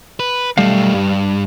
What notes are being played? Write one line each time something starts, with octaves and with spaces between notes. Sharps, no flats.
B4
B1 G3 A3 F5
G2